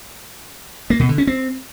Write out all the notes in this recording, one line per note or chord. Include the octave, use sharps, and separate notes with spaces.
A#3
B2
D3
C#4
C4